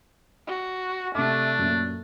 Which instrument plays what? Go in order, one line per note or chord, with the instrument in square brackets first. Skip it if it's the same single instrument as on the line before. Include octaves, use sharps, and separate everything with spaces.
[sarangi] F#4
[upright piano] C3 D6 [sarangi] A3 [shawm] D4
[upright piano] F#2 A#2 A#3